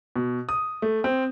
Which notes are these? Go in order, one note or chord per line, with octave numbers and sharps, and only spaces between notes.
B2
D#6
A3
C4